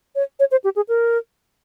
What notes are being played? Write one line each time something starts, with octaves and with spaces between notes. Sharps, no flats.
C#5
C#5
C5
G4
G#4
A#4